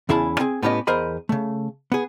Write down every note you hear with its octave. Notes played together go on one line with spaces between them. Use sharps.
E2 C#3 E4 G#4 A5 B5
C4 G#4
A2 B3 C#4 G4 A#4 D#5
E2 A#4 C5 D#5 B5
C#3 A3
B3 G#4